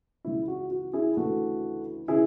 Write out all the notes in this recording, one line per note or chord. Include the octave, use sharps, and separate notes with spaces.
C#2 C#3 E3 E4
F#4
F#4
E4 G#4
D2 C#3 E3 F#4 A4
C#3 E3 E4 G#4